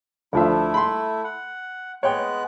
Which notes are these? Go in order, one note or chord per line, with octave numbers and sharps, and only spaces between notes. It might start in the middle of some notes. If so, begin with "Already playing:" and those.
D2 F3 A3 E4 E5
B5 C6
F#5
G#3 B3 C#5 G5 F#6